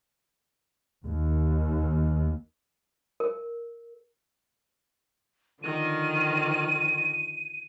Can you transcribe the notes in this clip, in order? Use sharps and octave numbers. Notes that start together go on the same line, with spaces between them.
D#2
A#4
D3 D#3 F3 D#7